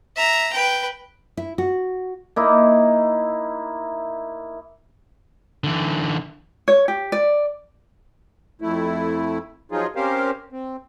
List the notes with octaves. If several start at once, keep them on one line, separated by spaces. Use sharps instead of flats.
E5 A#5
B4 G5
E4
F#4
A#3 D#4 E4
D3 E3
C#5
G4
D5
F2 A3 E4
F3 F#3 D#4 F4 G#4
C4 C#4 G4 A#4 C5 F5
C4